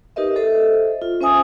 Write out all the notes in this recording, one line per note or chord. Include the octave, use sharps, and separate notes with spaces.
D#4 G4 A#4 B4 D#5 E5
A4 C5 D#5 E5
F4
C#4 C5 E5 G#5 D#6